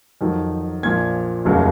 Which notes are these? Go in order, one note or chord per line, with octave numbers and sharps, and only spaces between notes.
F2 D#3 F#3
A#1 A#2 F3 G#6
F1 D#2 C#3 F#3